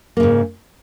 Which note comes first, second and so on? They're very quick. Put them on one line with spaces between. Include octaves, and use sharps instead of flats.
A#3 C#3 G#2